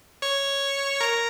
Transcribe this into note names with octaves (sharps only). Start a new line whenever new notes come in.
C#5 C#6
A#4 A#5